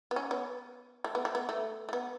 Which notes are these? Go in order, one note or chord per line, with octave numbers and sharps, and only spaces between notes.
B3
C#4
B3
A3
B3
A3
B3
A3
A3
B3